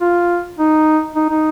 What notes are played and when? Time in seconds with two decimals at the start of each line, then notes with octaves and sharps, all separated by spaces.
0.01 F4
0.58 D#4
1.16 D#4
1.29 D#4